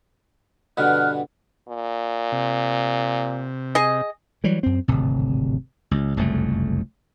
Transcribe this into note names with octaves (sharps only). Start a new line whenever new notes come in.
G2 B2 D3 F6 F#6
A#2
C3
G#4 D#5
E3 F#3 G3
F#2 C4
D1 G#1 C3
C#2
F#1 C2 F2 A3